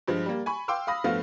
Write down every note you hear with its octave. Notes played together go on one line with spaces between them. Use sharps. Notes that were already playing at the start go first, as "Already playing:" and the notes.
G2 F3 G#3
G3 A#3
G#5 B5 C#6
F5 G5 C6 D6 E6
F5 B5 D#6 A#6
G2 F3 A3 B3 F4 F5